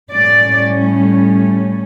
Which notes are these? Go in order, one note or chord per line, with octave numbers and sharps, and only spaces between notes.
A2 G3 C#4 D5